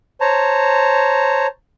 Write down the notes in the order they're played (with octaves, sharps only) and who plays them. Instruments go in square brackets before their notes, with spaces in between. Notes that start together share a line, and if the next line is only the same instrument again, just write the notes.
[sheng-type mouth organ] C5 C#5 A5 A#5